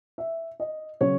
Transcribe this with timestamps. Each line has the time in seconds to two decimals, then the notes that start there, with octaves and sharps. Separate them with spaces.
0.18 E5
0.60 D#5
1.01 C#3 F#3 C#4 C#5